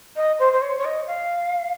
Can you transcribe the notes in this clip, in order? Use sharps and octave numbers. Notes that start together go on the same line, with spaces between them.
D#5
C5
C5
C#5
C#5
D#5
F5